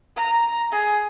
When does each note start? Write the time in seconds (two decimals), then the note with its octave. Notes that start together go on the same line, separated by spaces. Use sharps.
0.16 A#5
0.72 G#4